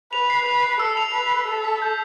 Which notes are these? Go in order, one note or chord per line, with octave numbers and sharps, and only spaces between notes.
B4 F7
C7
B4 F7
C7
A4 E6
F7
B4 F7
C7
A4 F7
B6
G6